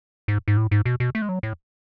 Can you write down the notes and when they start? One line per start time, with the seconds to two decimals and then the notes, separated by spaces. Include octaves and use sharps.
0.28 G#2
0.48 G#2
0.57 A2
0.71 G#2
0.85 B2
1.00 B2
1.15 A3
1.22 G#3
1.29 F#3
1.43 A2